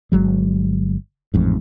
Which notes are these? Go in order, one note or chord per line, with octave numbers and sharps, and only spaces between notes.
G1 F#3 G#3
A1 F2 G#2